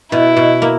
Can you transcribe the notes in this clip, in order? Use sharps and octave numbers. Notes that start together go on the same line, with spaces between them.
B2 E4
B2
A#3